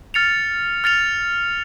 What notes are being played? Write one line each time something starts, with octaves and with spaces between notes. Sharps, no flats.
F6 A6 C#7 F7
F6 A6 C#7 F7